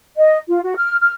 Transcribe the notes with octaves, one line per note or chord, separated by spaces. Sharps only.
D#5
F4
F#4
F6
F6